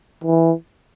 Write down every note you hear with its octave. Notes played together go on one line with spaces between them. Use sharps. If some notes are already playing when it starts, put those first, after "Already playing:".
E3